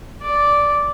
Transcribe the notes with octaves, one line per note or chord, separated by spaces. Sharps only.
D5